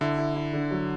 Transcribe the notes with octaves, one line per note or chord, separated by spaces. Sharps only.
D3 E4
E4
E4
D3
F#3